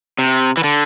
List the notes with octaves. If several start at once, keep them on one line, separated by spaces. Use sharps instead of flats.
C3
E3
D3